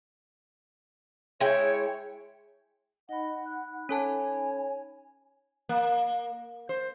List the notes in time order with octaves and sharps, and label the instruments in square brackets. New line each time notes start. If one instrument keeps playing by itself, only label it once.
[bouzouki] G#3 E4 G5 [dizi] C#5
[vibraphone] D#4 B5 [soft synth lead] D#5 [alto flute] F#5
[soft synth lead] F#6
[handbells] C#4 A4 A5 [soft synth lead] C#5 [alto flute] G#5
[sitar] A#3
C5